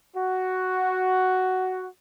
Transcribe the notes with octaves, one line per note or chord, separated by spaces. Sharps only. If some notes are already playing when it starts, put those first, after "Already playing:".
F#4